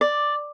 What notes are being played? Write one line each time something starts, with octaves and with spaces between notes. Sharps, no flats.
D5